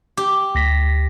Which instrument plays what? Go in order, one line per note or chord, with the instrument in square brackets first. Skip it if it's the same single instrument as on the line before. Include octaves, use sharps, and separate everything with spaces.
[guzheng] G4
[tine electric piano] D2 A#6 B6